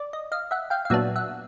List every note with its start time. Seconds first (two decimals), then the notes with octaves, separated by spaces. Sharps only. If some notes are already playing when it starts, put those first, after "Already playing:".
Already playing: D5
0.13 D#5
0.32 D#5 F5
0.51 E5 F#5
0.70 F5 G5
0.85 F5
0.90 A#2 F#3 B3 D4 E5 F#5
1.16 E5 F#5